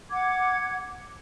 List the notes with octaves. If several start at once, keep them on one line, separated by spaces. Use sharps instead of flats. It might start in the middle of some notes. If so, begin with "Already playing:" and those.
F#5 D6 G#6